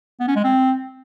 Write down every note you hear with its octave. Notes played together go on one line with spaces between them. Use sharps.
B3
C#4
G#3
C4